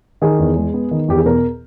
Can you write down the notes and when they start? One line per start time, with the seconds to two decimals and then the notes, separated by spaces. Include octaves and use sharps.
0.22 D#3 G#4
0.39 E2
0.57 G#3
0.74 B3
0.91 D#3
1.08 E2 G4
1.17 G#4
1.25 B2 A#4